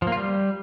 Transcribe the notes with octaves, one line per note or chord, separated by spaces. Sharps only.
F3
A#3
F4
G3